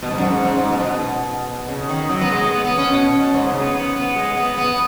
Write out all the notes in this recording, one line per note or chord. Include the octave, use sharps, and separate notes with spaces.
B2
G#2
F#2
G#2
G#2
G#2
B2
G#2
B2
C#3
D#3
F#3
B3
G#3
B3
B3
C#4
B2
B2
G#2
C#3
B3
B3
B3
G#3
B3
B3